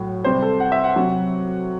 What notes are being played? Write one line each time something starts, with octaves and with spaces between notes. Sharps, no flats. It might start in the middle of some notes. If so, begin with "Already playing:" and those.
Already playing: A2 F#3
C3 G3 C5
A4
F#5
E5
F#5
C3 F#3